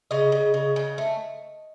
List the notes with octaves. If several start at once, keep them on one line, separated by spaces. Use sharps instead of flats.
C#3 D#5
C#3
C#3
C#3
A3